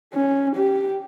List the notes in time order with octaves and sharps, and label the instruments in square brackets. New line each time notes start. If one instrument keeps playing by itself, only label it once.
[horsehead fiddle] C#4
G4